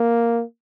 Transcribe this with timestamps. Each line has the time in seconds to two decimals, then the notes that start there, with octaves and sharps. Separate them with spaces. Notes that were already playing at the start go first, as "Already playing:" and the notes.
Already playing: A#3